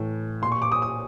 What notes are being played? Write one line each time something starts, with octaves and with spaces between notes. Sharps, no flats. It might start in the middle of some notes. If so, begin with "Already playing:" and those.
Already playing: A2 E3
A#2 C6
C#6
D6
D#6
D#6